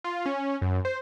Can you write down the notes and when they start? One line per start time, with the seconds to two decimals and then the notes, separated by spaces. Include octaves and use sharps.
0.04 F4
0.26 C#4
0.62 F#2
0.85 C5